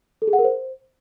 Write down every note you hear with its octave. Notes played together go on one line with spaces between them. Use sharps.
A4
G#4
F#5
A#4
C5